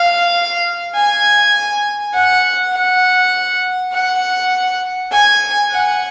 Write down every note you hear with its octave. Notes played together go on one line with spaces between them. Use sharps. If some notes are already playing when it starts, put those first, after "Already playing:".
Already playing: F5
G#5
F#5
F#5
F#5
G#5
F#5